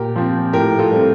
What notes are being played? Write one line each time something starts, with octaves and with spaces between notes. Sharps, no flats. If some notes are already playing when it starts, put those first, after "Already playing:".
Already playing: A#2 G4 A#4
F3 C4
A2 G4 A#4
F4 A4
G3 C4
A4